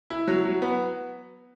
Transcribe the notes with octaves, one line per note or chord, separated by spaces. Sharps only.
E4
F#3
F#3
B3